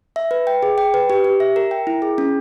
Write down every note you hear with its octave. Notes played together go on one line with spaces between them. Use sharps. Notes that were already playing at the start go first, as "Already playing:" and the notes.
E5
B4
G5
G#4
G5
B4
G4
G4
E5
A#4
G5
E4
G#4
C#4